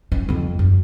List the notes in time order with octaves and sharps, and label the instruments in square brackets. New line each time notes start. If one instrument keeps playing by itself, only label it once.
[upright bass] F#3 C#4
F2 F3
F#2